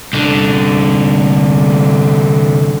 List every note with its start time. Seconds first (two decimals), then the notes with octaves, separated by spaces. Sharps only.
0.13 C2 D3